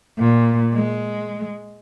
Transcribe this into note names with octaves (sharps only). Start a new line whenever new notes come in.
A#2
G#3